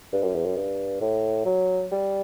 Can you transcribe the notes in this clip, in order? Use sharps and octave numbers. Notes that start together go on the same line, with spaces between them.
G2
F#2
E2
F#2
G2
A2
F#3
G3